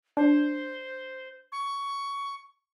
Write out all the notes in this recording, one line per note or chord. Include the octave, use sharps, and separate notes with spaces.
D4 C5
C#6